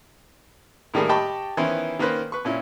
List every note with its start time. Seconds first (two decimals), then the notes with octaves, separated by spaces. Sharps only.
0.94 A2 D#3 G3 A#3 G#4
1.09 G4 D#5 G5 A5 B5 C#6
1.57 D#3 E3 B3 C#4 E4 C5
1.99 D#3 A#3 C#4 B4 C5
2.32 B4 C#6
2.45 A#2 C#4 E4